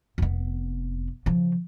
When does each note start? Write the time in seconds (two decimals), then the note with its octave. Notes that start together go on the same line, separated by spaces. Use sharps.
0.18 F1 B3
1.26 C#3 F3